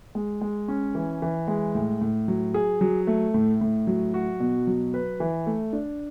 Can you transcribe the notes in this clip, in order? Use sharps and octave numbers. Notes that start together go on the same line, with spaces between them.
G#3
G#3
C#4
E3
E3
G#3
A2
A2
F#3
G#4
F#3
A3
A2
A2
F#3
F#4
B2
F#3
B4
E3
A3
D4